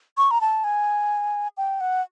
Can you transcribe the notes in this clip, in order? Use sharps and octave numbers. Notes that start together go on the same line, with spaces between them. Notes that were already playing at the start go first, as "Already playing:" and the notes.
C#6
A#5
A5
G#5
G5
F#5